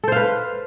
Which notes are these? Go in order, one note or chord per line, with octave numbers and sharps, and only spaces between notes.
A4 B4 C5 F5